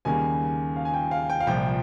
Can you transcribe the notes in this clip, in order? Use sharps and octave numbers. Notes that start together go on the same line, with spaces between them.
D#2 C#3 G3 A#3 G#5
F5
G#5
G5
F5
G5
F5
C2 A#2 F3 G5